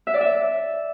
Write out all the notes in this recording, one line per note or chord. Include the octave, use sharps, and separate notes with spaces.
E5
D5
E5